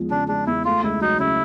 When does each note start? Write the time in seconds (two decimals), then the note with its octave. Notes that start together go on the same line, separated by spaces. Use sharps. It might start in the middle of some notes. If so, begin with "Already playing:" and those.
Already playing: E2 F3 G#3
0.10 C#3 D4
0.28 G#3 D4
0.47 E2 E4
0.65 A3 F4
0.83 C#2 E4
1.01 F#3 D#4
1.19 C#3 E4